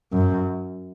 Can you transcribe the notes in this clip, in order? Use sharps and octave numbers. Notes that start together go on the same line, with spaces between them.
F#2